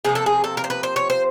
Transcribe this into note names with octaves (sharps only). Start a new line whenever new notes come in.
C3 F3 A#3 G#4
A4
G#4
A4
A#4
C5
B4
C5
C#5
C5